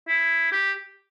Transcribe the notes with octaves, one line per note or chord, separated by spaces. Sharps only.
E4
G4